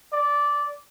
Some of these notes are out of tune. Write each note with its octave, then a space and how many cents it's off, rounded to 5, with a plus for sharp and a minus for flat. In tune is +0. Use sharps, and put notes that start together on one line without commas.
D5 -10